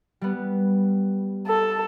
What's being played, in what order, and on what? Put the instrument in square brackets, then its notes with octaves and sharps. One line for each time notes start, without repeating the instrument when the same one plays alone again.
[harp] G3 B3
[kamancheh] A4